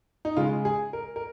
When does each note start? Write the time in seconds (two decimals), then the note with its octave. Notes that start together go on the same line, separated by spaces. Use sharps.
0.25 D#4
0.37 C#3 G#3 F4
0.65 G#4
0.93 A#4
1.16 A#4